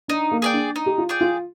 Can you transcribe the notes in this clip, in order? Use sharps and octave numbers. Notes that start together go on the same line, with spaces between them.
D4 D#4
A#3
G#4 D5 G5
D4
D#4
G4
F4
G#4 D5 G5
F4